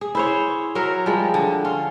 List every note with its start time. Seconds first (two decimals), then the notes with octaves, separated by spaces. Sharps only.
0.01 G#4
0.15 E4 C5 C#5
0.75 F#3 A#4 C#5 E5
1.06 F3 G3 G#3
1.34 D3
1.65 C#4 F4